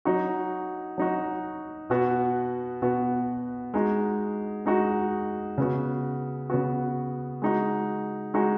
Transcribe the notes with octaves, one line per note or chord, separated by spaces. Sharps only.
F#3 D#4 F#4
F#3 D#4 F#4
B2 B3 F#4
B2 B3 F#4
G#3 D#4 F#4
G#3 D#4 F#4
C#3 B3 F#4
C#3 B3 F#4
G#3 D#4 F#4
G#3 D#4 F#4